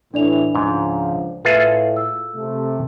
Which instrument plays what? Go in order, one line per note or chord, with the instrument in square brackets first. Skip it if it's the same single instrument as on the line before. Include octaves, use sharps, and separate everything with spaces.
[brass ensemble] A2 E3 [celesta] D4 D5 F7
[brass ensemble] C#2 F3 [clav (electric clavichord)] G#2
[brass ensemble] A2 [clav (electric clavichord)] F4 G#4 A4 [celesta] B4 E5
[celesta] E6
[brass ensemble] C3 A3